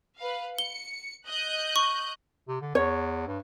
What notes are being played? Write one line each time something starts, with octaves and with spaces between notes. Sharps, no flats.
B4 F5
C#7 G7
D#5 F#6 G6
C#6
C3
D3
E2 C#5
G2